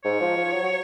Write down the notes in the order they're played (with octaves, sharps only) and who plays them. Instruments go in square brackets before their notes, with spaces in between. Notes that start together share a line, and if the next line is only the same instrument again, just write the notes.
[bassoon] G#2 [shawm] C#5
[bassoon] F3
F3
F#3
F#3